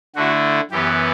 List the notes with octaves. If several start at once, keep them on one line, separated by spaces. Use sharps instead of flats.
D3 A3 E4 F#4
F#2 E3 B3 G4